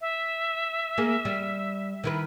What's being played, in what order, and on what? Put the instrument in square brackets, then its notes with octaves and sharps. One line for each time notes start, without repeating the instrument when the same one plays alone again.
[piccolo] E5
[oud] A#3 G#4
G3
D#3 E4 B4